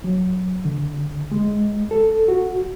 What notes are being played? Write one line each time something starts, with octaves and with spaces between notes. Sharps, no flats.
F#3
D3
G#3
A4
F#4